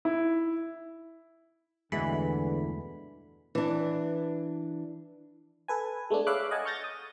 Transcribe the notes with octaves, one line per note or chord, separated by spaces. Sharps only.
E4
G1 E2 B2 D3 E3 G#3 A3 B5
E3 D4
A4 B4 G#5
G#3 A3 B3 D4
C#5 E5 F5 B5 D6 F#6
D#5 F#5 G#5 A5
C#6 F6 G6 A6 A#6
D#6